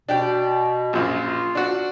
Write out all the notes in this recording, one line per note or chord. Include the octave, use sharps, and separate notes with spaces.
B2 D4 G4 G5
A#1 F#2 F4
D4 F#4